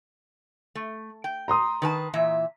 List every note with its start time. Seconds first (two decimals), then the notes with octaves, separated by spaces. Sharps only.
0.75 A3
1.24 G5
1.48 A#5 C6 D#6
1.82 D#3 B4 A5
2.13 A#2 E3 E5